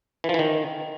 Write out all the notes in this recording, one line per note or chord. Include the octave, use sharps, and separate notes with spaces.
E3
F3
E3
D#3